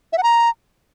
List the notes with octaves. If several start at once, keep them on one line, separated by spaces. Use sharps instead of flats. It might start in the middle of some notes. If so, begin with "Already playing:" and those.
E5
F#5
A#5